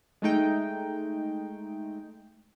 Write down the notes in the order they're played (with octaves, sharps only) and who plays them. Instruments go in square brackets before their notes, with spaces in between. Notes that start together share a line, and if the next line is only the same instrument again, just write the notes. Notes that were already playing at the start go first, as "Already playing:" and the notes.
[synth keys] G#3 A3 D#4 G5